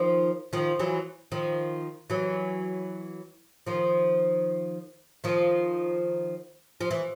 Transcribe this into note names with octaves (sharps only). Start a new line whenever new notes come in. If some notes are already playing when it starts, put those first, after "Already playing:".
Already playing: D#3 F3
D#3 F3
E3 F#3
D#3 F3
E3 F#3
D#3 F3
D#3 F3
F3
E3